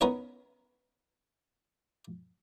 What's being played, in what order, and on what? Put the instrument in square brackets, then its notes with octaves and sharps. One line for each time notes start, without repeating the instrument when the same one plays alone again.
[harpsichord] B3 C#4 D#4 A#4 B4 C#5